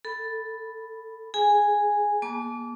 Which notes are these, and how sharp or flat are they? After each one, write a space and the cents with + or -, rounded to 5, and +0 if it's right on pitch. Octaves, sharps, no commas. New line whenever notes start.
A4 +0 B5 +0
G#4 +0 G#5 -10
A#3 +40 A5 -35 D6 -25